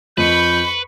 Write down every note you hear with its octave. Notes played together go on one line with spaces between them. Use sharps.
F2 B4 D#5 B5 C#6 G6 D#7